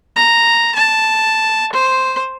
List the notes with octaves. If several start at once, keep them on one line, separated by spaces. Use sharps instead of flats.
A#5
A5
C5